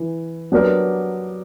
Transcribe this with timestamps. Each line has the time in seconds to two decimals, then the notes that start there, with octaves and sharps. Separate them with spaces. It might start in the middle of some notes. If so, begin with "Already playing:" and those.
Already playing: E3
0.52 F#3 B3 D4 G4 A#4